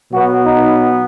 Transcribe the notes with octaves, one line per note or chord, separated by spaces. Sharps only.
B2 F#3 B3 F#4
D#4